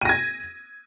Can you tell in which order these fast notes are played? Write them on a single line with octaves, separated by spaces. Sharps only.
D#7 A#6 G#6